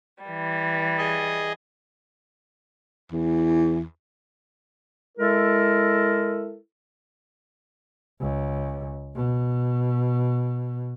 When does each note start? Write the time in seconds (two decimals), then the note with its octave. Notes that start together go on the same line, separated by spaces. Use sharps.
0.25 E3 G3
0.98 G#4 D#5
3.12 E2
5.18 G#3 E4 A4 A#4
8.20 C#2
9.15 B2